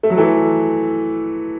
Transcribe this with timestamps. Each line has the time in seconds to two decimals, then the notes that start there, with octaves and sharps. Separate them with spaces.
0.03 A3
0.10 F#3
0.18 E3 A3